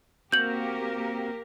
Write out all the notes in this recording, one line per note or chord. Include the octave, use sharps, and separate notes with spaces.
A#3 C4 F#4 G4 A#4 F5 G6 F#7